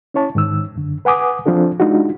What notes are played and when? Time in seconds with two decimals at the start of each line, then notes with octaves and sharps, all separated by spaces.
0.14 C#4 E4 C#5 A5
0.35 G#2 D#3 E6
0.76 F#2 D3
1.05 B4 F#5 G#5 D6 D#6
1.46 F3 C4 D4 F4 A4
1.80 G#3 D4 D#4 F4 F#4